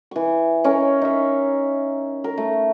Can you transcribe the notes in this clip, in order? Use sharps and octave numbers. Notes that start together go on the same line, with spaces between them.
E3 C#6
C#4 A#4 C#5 D#5
D#4 E5
A#4
A3